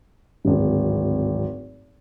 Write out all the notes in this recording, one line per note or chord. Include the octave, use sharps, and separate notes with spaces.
D1 G#1